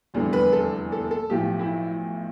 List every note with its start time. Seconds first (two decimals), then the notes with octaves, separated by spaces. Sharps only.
0.14 F1 E2 D3 G3
0.33 B4
0.52 A4
0.92 A4
1.11 A4
1.30 B1 A2 F3 G4
1.59 E4